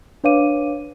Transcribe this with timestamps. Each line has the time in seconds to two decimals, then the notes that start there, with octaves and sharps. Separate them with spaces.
0.24 D4 B4 C#5 F5 D6 D#7